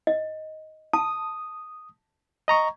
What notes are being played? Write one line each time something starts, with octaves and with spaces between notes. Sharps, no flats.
D#5
A5 D#6
D#5 A#5 C#6